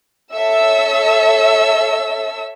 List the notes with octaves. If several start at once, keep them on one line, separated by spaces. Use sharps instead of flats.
A4 C#5 E5 E6